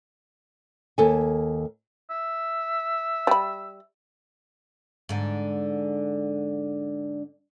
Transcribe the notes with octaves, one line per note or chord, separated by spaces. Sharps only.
D#2 A4 G#5
E5
G3 B5
G#2 D3